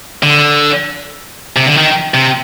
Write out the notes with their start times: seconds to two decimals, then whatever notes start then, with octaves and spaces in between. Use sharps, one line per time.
0.23 D3
1.56 C3
1.66 D3
1.77 D#3
2.14 C3